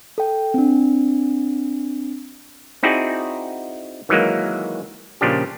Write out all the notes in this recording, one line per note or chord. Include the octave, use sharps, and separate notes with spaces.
A4 G5
C4 D4
C4 D#4 E4 F#4 G#4 D5
D#3 E3 F#3 G#3 A#3
A#2 C#3 F3 D4 G4